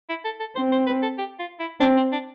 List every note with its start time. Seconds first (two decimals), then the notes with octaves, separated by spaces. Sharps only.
0.09 E4
0.25 A4
0.40 A4
0.56 C4 C5
0.72 C5
0.87 B4
1.02 A4
1.18 G4
1.39 F4
1.59 E4
1.80 C4 D4
1.96 C4
2.12 D4